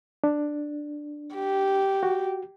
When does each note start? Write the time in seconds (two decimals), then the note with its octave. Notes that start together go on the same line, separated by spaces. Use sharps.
0.24 D4
1.35 G4
2.03 F#4